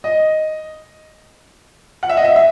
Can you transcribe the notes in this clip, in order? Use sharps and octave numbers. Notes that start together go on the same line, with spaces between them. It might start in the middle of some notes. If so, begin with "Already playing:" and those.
D#5
F#5
E5
D#5
E5
E5